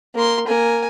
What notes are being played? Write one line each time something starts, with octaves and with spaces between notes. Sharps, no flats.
A#3 C6
A#3 G#5